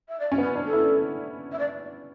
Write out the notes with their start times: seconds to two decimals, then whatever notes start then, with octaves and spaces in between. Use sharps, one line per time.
0.08 E5
0.20 D5
0.32 C#4
0.38 B3 B4
0.55 D4
0.66 A4
0.73 E4
1.52 E5
1.59 D5